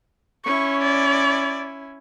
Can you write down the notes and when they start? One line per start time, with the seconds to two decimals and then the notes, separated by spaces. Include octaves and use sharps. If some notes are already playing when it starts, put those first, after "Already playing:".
0.45 C#4 E4 C#6
0.82 D5